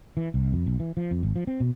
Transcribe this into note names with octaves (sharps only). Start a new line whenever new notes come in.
E3
C2
F2
B1
E3
F3
F2
G#1
F3
C4
B2